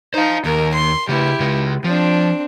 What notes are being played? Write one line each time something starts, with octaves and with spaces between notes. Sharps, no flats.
D#4 C5 F5
D#2 A#4
C6
C#3 A3 E4 G4
C#3 G#3
F3 C4 D4